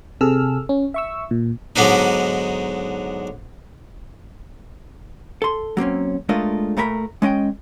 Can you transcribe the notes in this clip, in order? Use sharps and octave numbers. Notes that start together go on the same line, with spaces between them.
C3 G#4 A4 E6 F6
C#4
E5 C#6 E6
A#2
G#2 D3 F#3 B3 D4 D#4
A4 C6
F#3 A#3 C4 C#4
G#3 A3 D4 F4 A#4 D#5
A#2 A3 A#4 D5 B5
G#3 C#4 D#5 G5